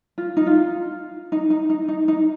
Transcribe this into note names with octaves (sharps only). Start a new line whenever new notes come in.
F4
D#4
F4
D#4
D#4
D#4
D#4
D#4